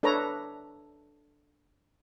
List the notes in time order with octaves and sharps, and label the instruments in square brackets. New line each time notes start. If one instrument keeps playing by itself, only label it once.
[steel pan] D4 A4 B4 C#5 A#5